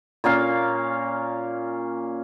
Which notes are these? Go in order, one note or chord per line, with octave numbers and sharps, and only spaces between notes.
A#2 A#3 C#4 F5